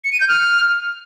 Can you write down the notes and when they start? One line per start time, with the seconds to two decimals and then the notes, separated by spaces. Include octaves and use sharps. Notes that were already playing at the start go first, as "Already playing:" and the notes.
0.04 C#7
0.12 D#7
0.20 G6
0.28 F6